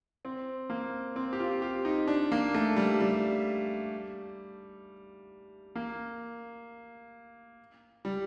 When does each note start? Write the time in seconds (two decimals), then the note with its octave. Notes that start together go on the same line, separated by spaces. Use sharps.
0.25 C4
0.70 A#3
1.16 C4
1.33 G4
1.39 F4
1.62 G4
1.85 D#4
2.07 D4
2.32 A#3
2.54 A3
2.76 G3
3.00 G3
5.76 A#3
8.05 G3